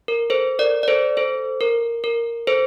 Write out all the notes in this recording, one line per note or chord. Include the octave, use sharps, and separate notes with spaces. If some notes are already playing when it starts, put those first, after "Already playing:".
A#4
A4 C5
A#4 D5
D5
A4 C5
A4 C5
A#4
A#4
A4 C5